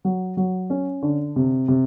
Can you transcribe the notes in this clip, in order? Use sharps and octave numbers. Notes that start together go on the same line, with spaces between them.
F#3
F#3
C#4
D3
C3
C3